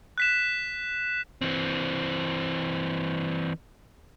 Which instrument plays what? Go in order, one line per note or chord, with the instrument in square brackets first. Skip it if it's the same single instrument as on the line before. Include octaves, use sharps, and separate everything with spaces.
[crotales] F#6 B6 E7
[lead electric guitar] E3 C4